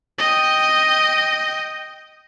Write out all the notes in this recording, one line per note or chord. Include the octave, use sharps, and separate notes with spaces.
D#5 G5